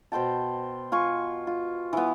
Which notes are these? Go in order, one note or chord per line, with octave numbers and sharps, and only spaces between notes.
B2 C5 G5 A5
F4 G#5 C#6
F4
E3 B3